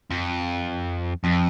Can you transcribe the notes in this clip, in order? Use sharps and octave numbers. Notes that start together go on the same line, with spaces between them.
F2
F2